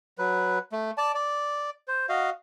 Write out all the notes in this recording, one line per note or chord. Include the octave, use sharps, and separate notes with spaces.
F#3 B4
A3
D5 A5
D5
C5
F#4 D#5 F5